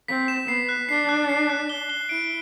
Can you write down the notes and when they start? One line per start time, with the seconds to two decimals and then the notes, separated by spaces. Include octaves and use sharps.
0.08 C4 B6
0.28 E7
0.48 B3 C7
0.69 F#6
0.89 D4 C7
1.09 F#6
1.29 C7
1.49 F#6
1.69 G7
1.90 G7
2.09 E4 D7